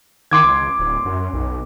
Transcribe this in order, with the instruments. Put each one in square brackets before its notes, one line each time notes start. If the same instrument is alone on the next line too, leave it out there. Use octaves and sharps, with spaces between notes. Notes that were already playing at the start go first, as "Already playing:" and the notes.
[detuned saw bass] D#3 [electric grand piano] C6 D6 G#6
[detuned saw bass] C#2
D1
F#2
B1